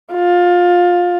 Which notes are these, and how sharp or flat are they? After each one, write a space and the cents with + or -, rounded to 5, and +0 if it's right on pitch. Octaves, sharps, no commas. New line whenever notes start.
F4 +20